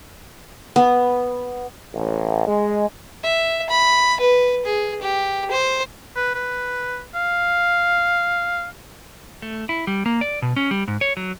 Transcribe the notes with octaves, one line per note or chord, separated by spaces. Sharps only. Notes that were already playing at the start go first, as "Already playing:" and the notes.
B3
A1
G#3
E5
B5
B4
G#4
G4
C5
B4
B4
F5
A3
E4
G3
A#3
D5
B2
C#4
G3
G#2
C#5
F#3